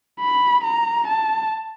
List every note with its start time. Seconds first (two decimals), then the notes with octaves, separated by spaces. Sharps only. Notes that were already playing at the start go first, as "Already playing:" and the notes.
0.20 B5
0.64 A#5
1.08 A5